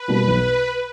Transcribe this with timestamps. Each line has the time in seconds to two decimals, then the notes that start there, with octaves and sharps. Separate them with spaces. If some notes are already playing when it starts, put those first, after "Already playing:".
Already playing: B4
0.08 B2 G3 A#3
0.27 B1